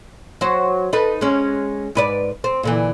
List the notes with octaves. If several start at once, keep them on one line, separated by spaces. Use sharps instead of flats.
F#3 F#4 C5
D#4 A4 B4
G#3 C#4
G#2 B4 D5
C4
A#2 D3 E3